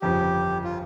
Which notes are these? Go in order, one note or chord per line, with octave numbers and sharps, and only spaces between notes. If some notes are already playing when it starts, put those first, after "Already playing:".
G1 F2 C#3 F3 G4
F4